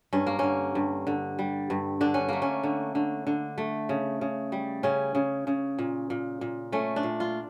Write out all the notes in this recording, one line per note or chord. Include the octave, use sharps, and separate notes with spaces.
G2 C#4
A#3
D3 C#4
G2
D3
G3
G2
D3 D4
C#4
A3 A#3
C#4
D3
D3
D3
A3
C#3
C#3
G3
C#3 C#4
C#3
C#3
A#2
A#2
A#2
A3 C#4
D4
A#2
F4